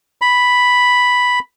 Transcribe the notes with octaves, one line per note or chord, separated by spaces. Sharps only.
B5